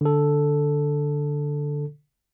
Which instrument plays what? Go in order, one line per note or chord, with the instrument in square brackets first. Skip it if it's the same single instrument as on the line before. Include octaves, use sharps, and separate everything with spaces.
[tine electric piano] D3 A4